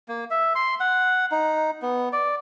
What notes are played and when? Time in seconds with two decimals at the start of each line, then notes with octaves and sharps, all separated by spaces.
0.08 A#3
0.31 E5
0.55 C6
0.80 F#5
1.31 D#4
1.82 B3
2.13 D5